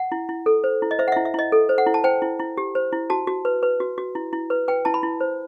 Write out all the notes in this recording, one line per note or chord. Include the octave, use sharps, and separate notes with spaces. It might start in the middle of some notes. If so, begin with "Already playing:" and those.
Already playing: F#5
E4
E4
A4
C5
E4
D#5
C5 E5
F#5
E4 E5
E5
E4 D#5
A4
C5
F#5
E4
A5
C5 G5
E4
E4
G4
C5
E4
F#4 A5
F#4
B4
B4
F#4
F#4
E4
E4
B4
B4 G5
E4 A5
B5
E4
C5